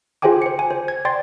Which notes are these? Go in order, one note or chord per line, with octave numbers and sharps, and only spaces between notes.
F4 G#4 C5 G5 G#5 D6
C5 C#7
G#5
C5
G#6
D5 G5 C6 A6